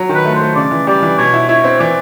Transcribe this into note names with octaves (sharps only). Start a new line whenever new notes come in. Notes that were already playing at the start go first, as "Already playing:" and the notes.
Already playing: F#3
D#3
B4
A3
C5
A3
C#3 D5
E3
G3 D5
E3
B2 C#5
E4
E4 C#5
C4
E3 D5